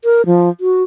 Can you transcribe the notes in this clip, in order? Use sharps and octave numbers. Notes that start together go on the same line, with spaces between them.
A#4
F3
F#4